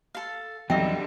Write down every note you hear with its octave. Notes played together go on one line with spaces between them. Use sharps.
A4 F5
E2 D3 F#3 G3 C4 D#4 E5 G5